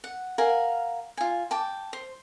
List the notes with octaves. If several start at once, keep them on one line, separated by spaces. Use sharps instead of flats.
F#5
A#4 F5 F#5 G#5
F4 G#5
G5 A5 D6
C5